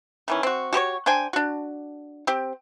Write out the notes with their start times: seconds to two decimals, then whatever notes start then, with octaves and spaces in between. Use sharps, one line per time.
0.28 D#3 E3 C#4
0.43 C4 F#4
0.73 F#4 G4 C5 C#5
1.06 D4 C5 G5 G#5
1.33 D4 F#4
2.27 C4 G4